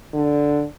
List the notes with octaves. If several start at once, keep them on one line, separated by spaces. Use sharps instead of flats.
D3